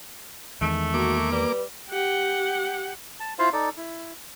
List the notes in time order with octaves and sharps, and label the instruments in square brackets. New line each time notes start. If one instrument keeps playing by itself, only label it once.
[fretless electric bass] E2 D#3 G#3 [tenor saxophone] A3
[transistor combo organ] A#3 D6 [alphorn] F#4
[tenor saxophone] G3 [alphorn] B4
[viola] G4 F#5
[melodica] A5
E4 F4 C5 F5
D#4 A4 D5
E4